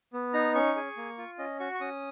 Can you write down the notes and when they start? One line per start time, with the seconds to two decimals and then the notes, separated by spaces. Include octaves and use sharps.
0.13 B3
0.34 D#4 A#5
0.55 C#4 C#6
0.76 G#4
0.97 A#3
1.18 F4
1.39 C#4 D#5
1.60 F#4 C#6
1.74 C#6
1.81 C#4 D#6